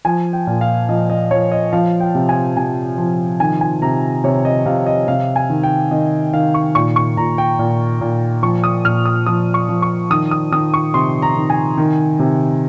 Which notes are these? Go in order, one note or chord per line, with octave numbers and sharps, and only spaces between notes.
F3 G#5
G5
A#2
F5
F3 D#5
D#5
F3 C#5
D#5
F3 F5
G5
C3
G#5
C3 G#5
F3
D#3 G#5
G#5
C3 A#5
C3 C#5
D#5
C3 F5
D#5
C3 F5
G#5
D#3
G5
D#3 D#5
D#3 F5
C#6
A#2 C#6
C#6
A#2 A#5
G5
A#2
A#2
F3 C#6
D#6
A#2 F6
D#6
F3 D#6
C#6
F3
C#6
D#3 D#6
D#6
D#3 D#6
C#6
C3 C6
A#5
D#3
G#5
D#3
C3